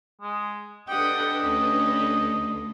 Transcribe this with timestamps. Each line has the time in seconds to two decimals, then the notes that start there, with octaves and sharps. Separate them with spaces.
0.21 G#3
0.88 D4 G4 A4 B4 D#5 F#5 G5 D#6
1.42 D2 C#4 G4